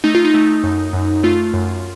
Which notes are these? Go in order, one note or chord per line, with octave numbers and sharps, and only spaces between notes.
A3 D#4
F4
D#4
A3
F#2
F#2
A3 F4
F#2